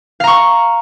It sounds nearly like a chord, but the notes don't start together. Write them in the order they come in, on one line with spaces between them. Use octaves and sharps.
F5 A#5 C#6